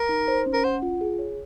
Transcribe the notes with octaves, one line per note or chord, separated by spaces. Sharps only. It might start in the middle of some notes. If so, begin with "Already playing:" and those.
Already playing: A#4
D#4
C5
C#4
A#4
C5 F#5
F4
G#4
C#5